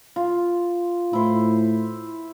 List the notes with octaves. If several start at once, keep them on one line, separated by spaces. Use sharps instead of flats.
F4
A2 E4 C5